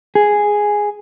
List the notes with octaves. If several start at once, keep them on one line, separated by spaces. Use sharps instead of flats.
G#4